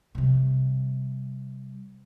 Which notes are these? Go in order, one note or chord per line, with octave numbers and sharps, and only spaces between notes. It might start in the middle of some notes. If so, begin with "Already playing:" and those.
C3 G3